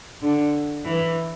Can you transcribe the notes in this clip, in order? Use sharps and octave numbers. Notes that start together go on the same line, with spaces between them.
D3
E3